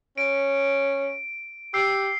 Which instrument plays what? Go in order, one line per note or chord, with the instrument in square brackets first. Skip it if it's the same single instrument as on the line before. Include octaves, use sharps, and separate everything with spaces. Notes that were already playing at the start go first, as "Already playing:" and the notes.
[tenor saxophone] C#4 [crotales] D7
[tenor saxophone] G4 [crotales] E6 C7